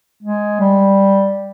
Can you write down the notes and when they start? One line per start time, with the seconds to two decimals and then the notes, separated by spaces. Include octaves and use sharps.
0.23 G#3
0.60 G3